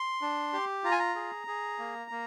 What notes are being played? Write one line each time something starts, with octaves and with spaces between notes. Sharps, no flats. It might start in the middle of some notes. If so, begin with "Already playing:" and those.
Already playing: C6
D4
G4
F4 A#5
G#5
A#5
G#4
G#4
A#3
A#3